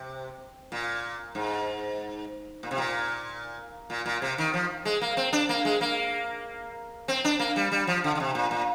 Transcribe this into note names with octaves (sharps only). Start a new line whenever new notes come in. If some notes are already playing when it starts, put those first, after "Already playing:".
Already playing: C3
A#2
G#2
A#2
C3
A#2
A#2
A#2
C3
D#3
F3
G#3
A#3
C4
D4
A#3
G#3
A#3
C4
D4
A#3
G3
G3
F3
D3
D3
C3
A#2
A#2